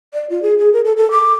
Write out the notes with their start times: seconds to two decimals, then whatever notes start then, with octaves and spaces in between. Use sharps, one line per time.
0.14 D5
0.30 F4
0.42 G#4
0.58 G#4
0.73 A#4
0.85 A4
0.97 A4
1.11 D6